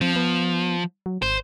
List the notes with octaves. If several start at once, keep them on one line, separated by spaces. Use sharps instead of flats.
F3 C4
B3
F#3
G#1 C5